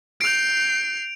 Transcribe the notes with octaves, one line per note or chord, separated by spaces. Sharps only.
G6 C7 D7 F7